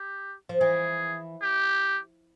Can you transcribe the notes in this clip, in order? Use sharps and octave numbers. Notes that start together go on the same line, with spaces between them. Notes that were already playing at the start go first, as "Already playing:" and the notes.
Already playing: G4
F3
E3 G#4
G4